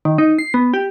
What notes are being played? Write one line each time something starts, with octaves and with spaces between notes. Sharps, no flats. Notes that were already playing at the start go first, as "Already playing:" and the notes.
D#3
D#4
C7
B3
G4